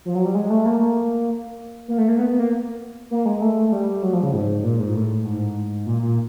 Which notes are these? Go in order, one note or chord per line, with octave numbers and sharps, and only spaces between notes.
F3
F#3
G3
G#3
A3
A#3
A#3
A3
A#3
B3
B3
A#3
A#3
G#3
A3
G3
F#3
F3
C#3
G#2
A#2
G#2
A2
G#2
A#2
A#2